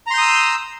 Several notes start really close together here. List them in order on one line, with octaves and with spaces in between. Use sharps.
A#5 C6 G6 D#6 E6